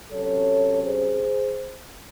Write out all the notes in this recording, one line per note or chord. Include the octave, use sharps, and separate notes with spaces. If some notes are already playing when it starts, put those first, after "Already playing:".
C3 F#3 C#4 A4 C#5
G#4 C5